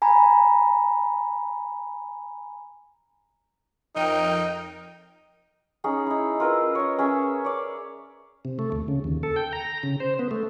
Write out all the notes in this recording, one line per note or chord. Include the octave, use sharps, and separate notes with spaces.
G#5 A#5 B5
F2 D#4 A#4 G5
C#4 D#4 G#4
D#4 E4
F4 A#4 B4 E6
C#5 D#5
C#4 G#4 E5
C#5 D5
C3
A3
D2
C#3
D#2
A4
G5
A#5
C#3
C5
B3
A3